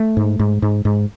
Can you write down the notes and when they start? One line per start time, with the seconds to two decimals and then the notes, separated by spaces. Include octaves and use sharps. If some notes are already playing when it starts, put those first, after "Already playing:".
Already playing: A3
0.17 G#2
0.39 G#2
0.62 G#2
0.85 G#2